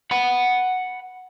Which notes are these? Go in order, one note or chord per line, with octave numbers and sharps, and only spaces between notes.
F#5 B5